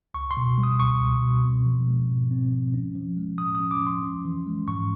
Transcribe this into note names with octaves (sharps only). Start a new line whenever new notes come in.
C#2 C#6
C6
B2
G3
D#6
C#2 C#6
C#2
B2
C4
F3
G#3
G#2
C4
F3
C#4
F3
G#3
A2 D#6
D#6
C#4
D6
F3
C6
C#4
E3
G#3
G#2 C#6